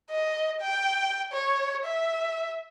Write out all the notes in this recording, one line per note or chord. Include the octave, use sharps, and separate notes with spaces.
D#5
G5
C#5
E5